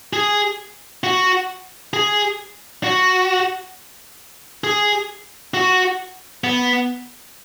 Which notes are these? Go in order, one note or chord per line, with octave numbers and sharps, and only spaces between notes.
G#4
F#4
G#4
F#4
G#4
F#4
B3